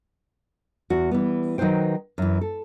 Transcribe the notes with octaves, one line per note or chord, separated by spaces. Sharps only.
E2 F#4
E3 G3 B3
D#3 F#3 D#4 B4 C5 G5
F#2 E3
A4